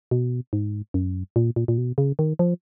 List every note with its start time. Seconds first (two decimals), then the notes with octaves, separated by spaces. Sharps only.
0.11 B2
0.53 G#2
0.94 F#2
1.36 A#2
1.56 A#2
1.68 A#2
1.78 B2
1.98 C#3
2.19 D#3
2.39 F3